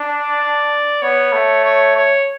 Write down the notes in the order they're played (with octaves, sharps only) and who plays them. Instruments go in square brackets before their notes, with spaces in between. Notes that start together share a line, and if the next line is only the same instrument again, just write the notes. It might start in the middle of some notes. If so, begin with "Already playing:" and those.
Already playing: [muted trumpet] D4
[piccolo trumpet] D5
[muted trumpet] B3 [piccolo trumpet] C#5
[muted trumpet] A3
[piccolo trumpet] C#5
C#5